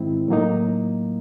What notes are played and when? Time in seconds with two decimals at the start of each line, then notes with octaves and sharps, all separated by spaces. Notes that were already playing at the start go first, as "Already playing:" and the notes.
Already playing: G#2 D#3 G#3 C4 E4
0.28 A2 F#3 A#3 D#4